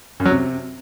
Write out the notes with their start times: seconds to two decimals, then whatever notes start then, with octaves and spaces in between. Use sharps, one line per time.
0.20 F#2
0.25 F#3
0.31 C3